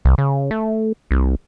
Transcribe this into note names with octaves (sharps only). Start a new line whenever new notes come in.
C2
C#3
A3
C2